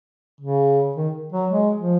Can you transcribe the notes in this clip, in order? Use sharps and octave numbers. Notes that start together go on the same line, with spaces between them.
C#3
D#3
F#3
G#3
F3